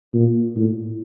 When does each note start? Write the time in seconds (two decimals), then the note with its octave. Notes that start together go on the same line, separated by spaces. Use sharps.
0.14 A#2
0.56 A2